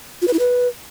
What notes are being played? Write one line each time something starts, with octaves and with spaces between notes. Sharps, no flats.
F4
B4
E4
B4